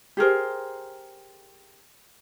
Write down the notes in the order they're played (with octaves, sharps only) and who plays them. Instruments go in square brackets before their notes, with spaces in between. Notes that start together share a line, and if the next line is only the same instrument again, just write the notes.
[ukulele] G4 G#4 A#4 C5